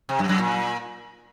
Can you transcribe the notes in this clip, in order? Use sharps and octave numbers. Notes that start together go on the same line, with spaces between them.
C3
F#2
F#2
A#2